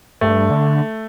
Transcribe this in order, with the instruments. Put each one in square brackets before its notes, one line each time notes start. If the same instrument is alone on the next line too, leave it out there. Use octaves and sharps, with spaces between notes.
[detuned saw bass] G2 [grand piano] A3
[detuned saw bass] D3